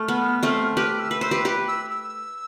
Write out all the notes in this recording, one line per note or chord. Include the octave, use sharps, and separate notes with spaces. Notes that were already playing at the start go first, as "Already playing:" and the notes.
Already playing: A3 F6
B3
A3 C4
G4 B4 F6
E6
B4
C5 E6
G4 B4
G4 B4
E6
E6